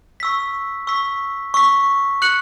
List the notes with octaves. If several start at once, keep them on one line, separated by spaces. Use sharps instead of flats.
C#6 E6 B6
C#6 E6 B6
C#6 E6 B6
F#6 C#7 F#7